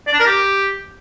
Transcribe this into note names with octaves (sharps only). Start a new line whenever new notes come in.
D5
D4
A#4
G4